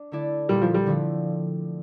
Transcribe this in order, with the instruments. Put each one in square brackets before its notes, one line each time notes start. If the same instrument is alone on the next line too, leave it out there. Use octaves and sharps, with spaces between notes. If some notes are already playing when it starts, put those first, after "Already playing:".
Already playing: [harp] D4
D3 A3 E4 A4 D5
[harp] A#2 A3 D4 [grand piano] G3
[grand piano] F3
G3
[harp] D3 F3 A3 C4